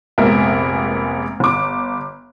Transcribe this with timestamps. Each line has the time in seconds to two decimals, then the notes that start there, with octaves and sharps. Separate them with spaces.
0.18 F1 A#1 G#3 B3 A#4 E5
1.40 G1 D6